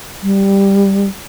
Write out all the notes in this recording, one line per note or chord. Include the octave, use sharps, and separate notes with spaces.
G3